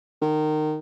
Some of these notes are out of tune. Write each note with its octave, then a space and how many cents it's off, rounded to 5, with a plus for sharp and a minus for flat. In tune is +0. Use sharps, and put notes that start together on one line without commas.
D#3 -20